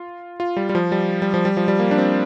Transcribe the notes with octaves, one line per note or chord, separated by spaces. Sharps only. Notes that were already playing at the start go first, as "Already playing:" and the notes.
Already playing: F4
F4
G3
G3
F3
G3
G3
F3
G3
F3
G3
A#3
D4
C4